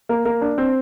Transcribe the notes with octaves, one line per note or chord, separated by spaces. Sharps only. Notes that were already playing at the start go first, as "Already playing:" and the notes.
A#3
A#3
D4
C4